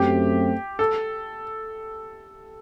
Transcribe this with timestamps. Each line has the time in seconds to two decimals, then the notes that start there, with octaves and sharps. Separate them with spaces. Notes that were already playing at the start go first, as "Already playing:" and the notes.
Already playing: F#2 F#3 A3 C4 G4
0.79 A4